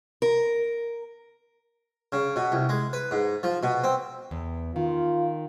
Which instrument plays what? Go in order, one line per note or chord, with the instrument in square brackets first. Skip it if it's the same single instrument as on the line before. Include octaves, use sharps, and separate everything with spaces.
[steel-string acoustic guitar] A#4
[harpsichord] C#3
B2
C2
G#3
B4
G#2
F3
B2
C4
[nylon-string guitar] E2
[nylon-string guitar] D#3 [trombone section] F4